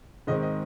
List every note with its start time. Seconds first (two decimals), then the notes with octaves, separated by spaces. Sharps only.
0.27 G#2 D#3 G#3 C4 D#5
0.42 D#5